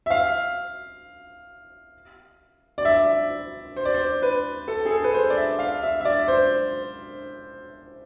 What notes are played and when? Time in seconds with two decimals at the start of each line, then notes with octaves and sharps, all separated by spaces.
0.06 E5
0.10 F5
2.78 D5
2.85 E5
3.76 C5
3.85 D5
3.94 C5
4.22 B4
4.68 A4
4.85 G#4
4.91 A4
5.04 B4
5.14 C5
5.30 D5
5.37 E5
5.59 F5
5.83 E5
6.00 E5
6.05 D5
6.28 C5